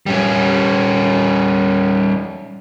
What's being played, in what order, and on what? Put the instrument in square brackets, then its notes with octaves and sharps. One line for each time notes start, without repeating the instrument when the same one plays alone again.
[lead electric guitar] G3 C#4